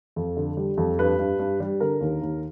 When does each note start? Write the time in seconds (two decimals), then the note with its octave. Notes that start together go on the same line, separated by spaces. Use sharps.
0.16 F2
0.36 D3
0.57 G3
0.77 F2
0.99 G2 B4
1.19 G2
1.39 G2
1.60 G3
1.80 D3 A#4
2.01 D#2
2.22 D#2